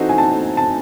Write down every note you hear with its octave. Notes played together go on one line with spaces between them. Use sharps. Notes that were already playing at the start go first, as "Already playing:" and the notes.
Already playing: E3 C4 D#4 F#4 A4
G#5
A5
A5